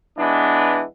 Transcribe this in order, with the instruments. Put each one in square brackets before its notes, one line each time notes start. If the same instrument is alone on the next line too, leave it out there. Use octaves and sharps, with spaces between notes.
[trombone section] E3 G#3 B3 D4